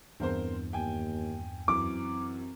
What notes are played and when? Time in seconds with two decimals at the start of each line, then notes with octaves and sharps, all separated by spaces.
0.20 E2 G2 C4 A#4 C5
0.73 D#2 G5 G#5
1.68 F#2 E3 C4 D6